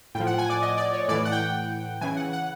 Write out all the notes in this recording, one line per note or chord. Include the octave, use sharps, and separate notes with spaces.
A2 F3 G5
F#5
G#5
D5
D#5
D5
C#5
A2 E3 D5
F#5
G5
C#3 E3 G#5
F#5
F#5